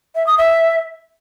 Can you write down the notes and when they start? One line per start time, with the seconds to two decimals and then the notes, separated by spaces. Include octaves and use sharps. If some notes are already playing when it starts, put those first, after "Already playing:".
0.15 E5
0.27 D#6
0.38 E5